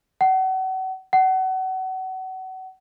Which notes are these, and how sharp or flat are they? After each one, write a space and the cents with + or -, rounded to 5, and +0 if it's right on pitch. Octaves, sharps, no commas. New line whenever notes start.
F#5 +35
F#5 +30